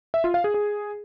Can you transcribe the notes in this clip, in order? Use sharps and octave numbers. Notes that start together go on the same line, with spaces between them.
E5
F4
F5
G#4
G#4